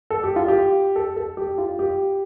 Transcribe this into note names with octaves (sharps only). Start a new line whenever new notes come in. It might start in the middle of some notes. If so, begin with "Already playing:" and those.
A4
G4
F4
G4
A4
A4
G4
F4
G4